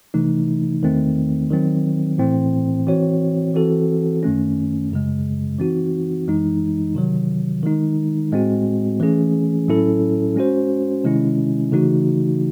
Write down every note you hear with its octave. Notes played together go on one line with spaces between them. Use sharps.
C3 E3 A3 D#4
E2 D#3 A3 C4
D#3 F#3 C4
A2 E3 C4
E3 C4 F#4 C#5
E3 C4 F#4 A4
F#2 D#3 A3 C#4
F#2 C#3 G#3
E3 C4 D#4 F#4
F#2 E3 G#3 D#4
C3 D#3 F#3
D#3 G#3 D#4
A2 G#3 C4 F#4
E3 A3 C#4 G#4
A2 F#3 C#4 E4 A4
G#3 C#4 F#4 C5
C3 D#3 G#3 C#4 E4
C#3 E3 A3 D#4 F#4